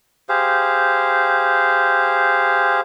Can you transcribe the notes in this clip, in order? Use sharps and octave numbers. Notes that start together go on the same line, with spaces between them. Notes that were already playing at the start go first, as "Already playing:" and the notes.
G4 G#4 C5 F5